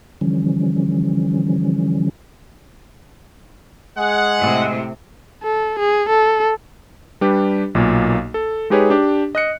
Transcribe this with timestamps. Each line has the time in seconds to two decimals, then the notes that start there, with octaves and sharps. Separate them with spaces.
0.21 D3 E3 F3 G3 C#4
3.97 G#3 G#4 F#5
4.38 A2 C3
5.43 A4
5.79 G#4
6.09 A4
7.21 G3 D4 G4 B4
7.75 B1 A#2 A#3
8.34 A4
8.70 G#3 D#4 G4 G#4 B4 C#5
8.90 D4 G4
9.35 D#5 F#6 C#7